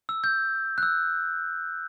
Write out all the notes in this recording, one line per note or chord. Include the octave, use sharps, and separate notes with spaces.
E6
G6
F#6
E6